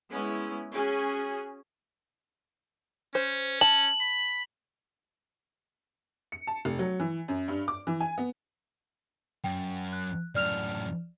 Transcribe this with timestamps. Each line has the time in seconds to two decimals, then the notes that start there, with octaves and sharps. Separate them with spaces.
0.11 G#3 B3 C#4 E4
0.73 C#4 F#4 G#4 G#5
3.15 C#4 C5
3.61 A5 F#7
4.01 B5
6.32 C#7
6.47 A5
6.65 F1
6.79 F#3
7.00 E3
7.28 F#2
7.48 G2
7.68 D6
7.87 E3
8.00 G#5
8.18 B3
9.44 F#2 G5
9.93 F#6
10.35 F#2 A2 D5 F6 F7